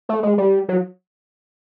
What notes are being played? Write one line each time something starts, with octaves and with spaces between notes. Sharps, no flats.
A3
G#3
G3
F#3